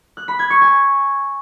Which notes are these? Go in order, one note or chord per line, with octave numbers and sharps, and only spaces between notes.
F#6
B5
G#6
C#6
G#5